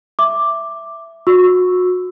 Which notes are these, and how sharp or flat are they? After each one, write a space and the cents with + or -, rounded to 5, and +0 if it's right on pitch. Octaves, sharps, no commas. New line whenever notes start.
E5 +5 D6 +5
F#4 -30 C#6 +0 E6 +0